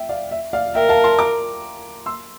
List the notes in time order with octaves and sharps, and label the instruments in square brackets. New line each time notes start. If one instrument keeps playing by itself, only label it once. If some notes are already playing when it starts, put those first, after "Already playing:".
Already playing: [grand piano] E5 G5
D5 F5
E5
D5 F5
[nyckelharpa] A#4 [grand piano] E5 G5
[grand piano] F5 A5
A5 C6
A#5 D6
C6 E6